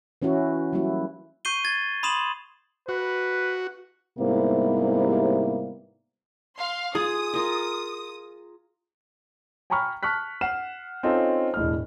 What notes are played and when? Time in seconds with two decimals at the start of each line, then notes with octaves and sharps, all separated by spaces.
0.22 E3 C#4 E4 F#4
0.73 F#3 G3 A#3 E4 F#4
1.45 C#6 G6 C7 D#7 G7
1.64 G#6 A6
2.03 B5 C6 D#6 E7 F#7
2.89 F#4 B4
4.19 G#2 C3 G3 A#3 B3 E4
6.58 F5 C6
6.95 F4 G#4 D#6
7.34 F4 A#4
9.70 G5 G#5 A#5 B5 C#6 F6
10.03 A5 C#6 F6 F#6 B6
10.41 F#5 F6 C7 E7
11.03 C4 C#4 D#4 F4 A4
11.54 E1 A2 D#5 F6